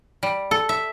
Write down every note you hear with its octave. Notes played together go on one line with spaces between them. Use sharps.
G3
A4
E5